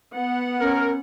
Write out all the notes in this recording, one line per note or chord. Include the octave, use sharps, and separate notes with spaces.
B3 F#5
C#4 A#4